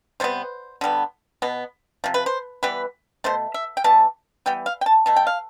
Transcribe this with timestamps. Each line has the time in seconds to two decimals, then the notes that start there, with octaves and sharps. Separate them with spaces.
0.20 C3 G3 B3 C5
0.81 D3 G3 B3
1.42 B2 B3
2.04 C3 F3
2.14 B4
2.26 C5
2.63 E3 G3 B3 B4
3.24 B2 A3 C5
3.54 E5
3.77 G5
3.84 E3 G3 B3 A5
4.46 E3 G3 B3 G5
4.66 F5
4.81 G5
4.86 A5
5.06 B2 A3 A5
5.16 G5
5.27 F5